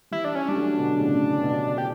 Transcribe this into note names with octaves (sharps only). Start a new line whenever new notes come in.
E3 G3 E4
D4
C#4
G3 D4
F#3 A3
B2 D3
A2 C#3
B2
G4